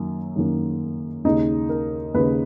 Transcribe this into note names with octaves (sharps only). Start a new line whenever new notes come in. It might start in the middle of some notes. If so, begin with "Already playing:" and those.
Already playing: F#2 D#3 F#3 A#3
F#2 D#3 F#3 A#3
D#2 C#3 G#3 D#4
A#4
D#2 C#3 G#3 B4